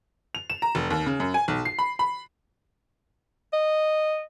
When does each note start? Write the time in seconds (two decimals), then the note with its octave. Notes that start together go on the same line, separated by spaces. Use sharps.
0.35 F7
0.50 E7
0.62 A#5
0.75 F1
0.90 D#2
1.06 C#3
1.20 F#2
1.34 G#5
1.48 B1
1.65 C7
1.79 B5
1.99 B5
3.53 D#5